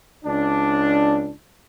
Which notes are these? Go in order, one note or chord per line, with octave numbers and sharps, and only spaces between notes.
C#2 D4